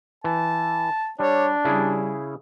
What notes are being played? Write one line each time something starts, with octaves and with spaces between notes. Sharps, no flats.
E3 A5
G3 D4 C#5
C#3 G3 E4 G#4